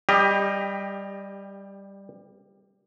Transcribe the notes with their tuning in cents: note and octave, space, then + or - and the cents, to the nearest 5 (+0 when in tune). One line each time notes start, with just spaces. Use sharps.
G3 +5 G4 +25 D#5 +0